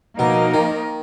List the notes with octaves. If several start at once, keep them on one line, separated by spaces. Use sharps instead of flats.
B2 F3 A#3 D#4 A#4
D#3